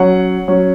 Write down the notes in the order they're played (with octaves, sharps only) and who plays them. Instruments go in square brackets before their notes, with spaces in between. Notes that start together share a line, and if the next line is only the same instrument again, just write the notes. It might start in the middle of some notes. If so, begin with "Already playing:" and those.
Already playing: [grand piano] F#3 C#4 F#5
F#3 C#4